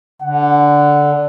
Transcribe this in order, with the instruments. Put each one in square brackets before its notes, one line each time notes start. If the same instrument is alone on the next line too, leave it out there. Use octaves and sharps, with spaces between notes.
[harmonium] D3 [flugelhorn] F#5